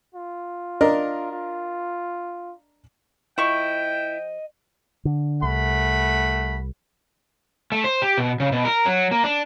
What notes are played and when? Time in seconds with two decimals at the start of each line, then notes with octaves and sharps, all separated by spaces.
0.14 F4
0.81 D4 A#4 D#5
1.32 F4
3.38 F3 E4 D#5 G5 C#6
5.05 D3
5.42 C2 A3 F#5 B5
7.72 A3
7.84 C5
8.02 G4
8.18 B2
8.40 C#3
8.52 B2
8.65 A#4
8.86 F#3
9.11 A#3
9.24 D4